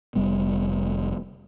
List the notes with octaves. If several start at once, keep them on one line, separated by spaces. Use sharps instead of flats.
F1 G3 B3